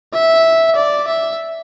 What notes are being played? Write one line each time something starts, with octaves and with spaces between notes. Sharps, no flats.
E5
D5
E5